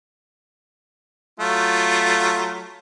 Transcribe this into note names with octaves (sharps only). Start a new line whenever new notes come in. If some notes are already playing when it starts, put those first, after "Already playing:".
F#3 A3 F4